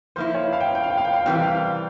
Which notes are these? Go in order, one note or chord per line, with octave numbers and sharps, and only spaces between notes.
F3 A#3 E4 C5
C#5
F5
G5
F5
G5
F5
G5
F5
G5
F5
G5
C3 E3 G3 F5
G5
F5